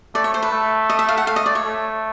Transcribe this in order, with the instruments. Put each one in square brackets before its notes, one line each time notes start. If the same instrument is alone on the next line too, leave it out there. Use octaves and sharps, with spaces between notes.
[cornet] A3 [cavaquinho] D5
[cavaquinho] C#5
C5
B4
[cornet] A3
[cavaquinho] D#5
E5
F5
F#5
[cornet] A3 [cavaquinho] F5
[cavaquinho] D#5
D5
C#5
[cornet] A3